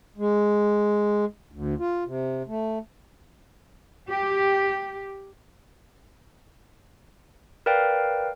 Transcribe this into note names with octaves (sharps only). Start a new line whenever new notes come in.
G#3
D2
F4
C3
A3
G4
A#4 B4 D5 F5 G5